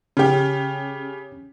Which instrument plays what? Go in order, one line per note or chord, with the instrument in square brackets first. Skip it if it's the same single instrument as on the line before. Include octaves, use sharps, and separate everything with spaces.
[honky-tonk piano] C#3 G4 [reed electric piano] C#4